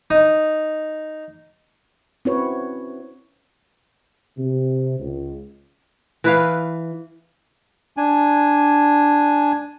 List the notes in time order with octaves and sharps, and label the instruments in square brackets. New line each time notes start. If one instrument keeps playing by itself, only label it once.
[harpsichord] D#4
[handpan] C4 C#4 E4 F#4 B4 C#5
[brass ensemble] C3
C#2
[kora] E3 B4 F5
[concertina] D4 G#5